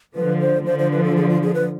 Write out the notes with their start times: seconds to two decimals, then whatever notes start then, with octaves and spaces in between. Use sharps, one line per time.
0.15 D3 F3 B4
0.41 C5
0.66 D3 F3 C5
0.79 C5
0.92 B4
1.04 A4
1.17 G#4
1.29 F4
1.43 G#4
1.54 B4